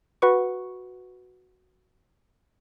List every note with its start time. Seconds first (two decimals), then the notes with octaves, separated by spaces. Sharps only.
0.22 F#4 B4 C#6